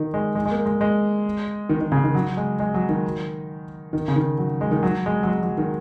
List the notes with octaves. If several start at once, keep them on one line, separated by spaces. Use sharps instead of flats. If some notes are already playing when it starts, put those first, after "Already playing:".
Already playing: D#3
G#3
G#3
G#3
A#3
G#3
G#3
D#3
D#3
C#3
D#3
F#3
G#3
G#3
F#3
D#3
D#3
C#3
D#3
F#3
G#3
D#3
F#3
G#3
F#3
G#3
F#3
D#3